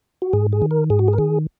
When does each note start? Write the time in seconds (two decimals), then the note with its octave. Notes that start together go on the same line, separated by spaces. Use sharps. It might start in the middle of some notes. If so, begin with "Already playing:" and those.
0.22 F#4
0.33 G#2 G#4
0.53 G#4
0.62 D#3
0.71 A#4
0.90 G#2 G#4
0.99 F#4
1.08 G#4
1.13 A#4
1.18 D#3 G#4